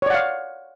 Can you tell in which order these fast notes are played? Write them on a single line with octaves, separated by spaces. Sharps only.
C#5 D5 F#5 F5